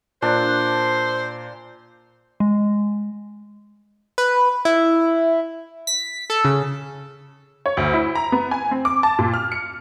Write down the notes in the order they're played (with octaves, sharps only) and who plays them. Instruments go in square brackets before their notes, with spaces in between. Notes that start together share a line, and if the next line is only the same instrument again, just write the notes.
[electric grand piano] A#2 [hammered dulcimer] D4 [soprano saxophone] C5
[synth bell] G#3
[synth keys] B4
E4
B6
A4
C#3
[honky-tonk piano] C#5
D2
E4
A#5
B3
G#5
C4
D6
A5
A#2
F6
C#7